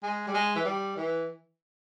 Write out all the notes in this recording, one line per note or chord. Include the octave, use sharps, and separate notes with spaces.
G#3
G3
G#3
E3
G3
E3